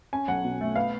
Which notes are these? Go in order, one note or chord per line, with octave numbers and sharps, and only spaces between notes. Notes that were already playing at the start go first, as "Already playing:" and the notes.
C#4 G#5
B1 F#5
B2
A3
B3 F5